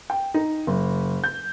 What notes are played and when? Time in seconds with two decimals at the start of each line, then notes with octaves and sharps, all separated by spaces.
0.10 G5
0.34 D#4
0.67 F#1
1.24 G6